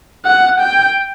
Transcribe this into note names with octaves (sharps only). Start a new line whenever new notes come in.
F#5
G5